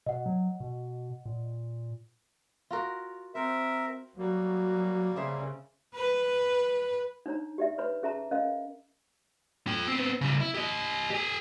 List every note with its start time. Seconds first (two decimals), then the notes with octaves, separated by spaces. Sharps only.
0.06 B2 D#5 F#5
0.26 F#3
0.60 B2
1.25 A#2
2.71 F4 F#4 A#4
3.35 C4 A#4 C5 E5
4.18 F#3 G3 A#3 F#4
5.16 C#3 C#4 G#4 C5 E5
5.95 B4
7.26 D4 D#4 C#5 A#5
7.58 G4 D5 E5
7.78 B4 C#5 B5
8.03 C#4 G#4 E5 A5 A#5
8.31 C#4 A#4 D#5 F5
9.67 F4 G5
9.88 B3 C4
10.21 C#3 G3
10.40 E4
10.54 G4 D#5
11.10 G4 G#5